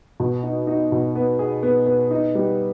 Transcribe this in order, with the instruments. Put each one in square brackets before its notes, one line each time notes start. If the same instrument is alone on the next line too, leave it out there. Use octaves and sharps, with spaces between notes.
[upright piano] B2
D#4
D#4
B2
B3
G#4
B3
B3
D#4
G3